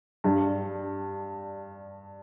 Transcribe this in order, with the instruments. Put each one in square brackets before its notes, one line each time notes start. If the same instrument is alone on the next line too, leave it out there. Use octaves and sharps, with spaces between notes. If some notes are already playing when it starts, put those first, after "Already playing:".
[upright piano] G2 G3 D4